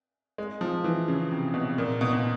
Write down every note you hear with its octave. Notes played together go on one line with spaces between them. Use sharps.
G#3
F3
E3
C#3
C3
B2
A#2
B2
B2